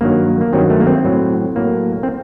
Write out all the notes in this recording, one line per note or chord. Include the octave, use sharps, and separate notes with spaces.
G2 D#3 F#3 A#3
A#3
G2 D#3 F#3 C4
A3
A#3
C4
A2 F#3
A2 F#3 A#3
C4